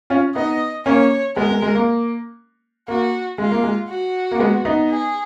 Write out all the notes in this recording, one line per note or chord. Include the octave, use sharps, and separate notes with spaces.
C#4 F4
B3 D#4 D#5
A#3 C#4 C#5
G#3 B3 A#4
G#3
G#3
A#3
A#3 F#4
G#3 F4
A#3
G#3
F#4
A#3
G#3 B3
B3 D#4
G#4